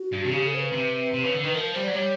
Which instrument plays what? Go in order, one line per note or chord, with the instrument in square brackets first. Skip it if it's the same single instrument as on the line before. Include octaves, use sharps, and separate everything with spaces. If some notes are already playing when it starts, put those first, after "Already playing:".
Already playing: [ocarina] F#4
[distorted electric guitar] G2
C3
[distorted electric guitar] C#3 [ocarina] G4
[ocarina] A4
C5
B4
[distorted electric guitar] C3
C3
C#3
D3
D#3
[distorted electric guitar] F3 [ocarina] A#4
[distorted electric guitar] G3 [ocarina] C5
[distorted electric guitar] F#3 [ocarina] D5
[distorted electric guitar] G3 [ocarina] C#5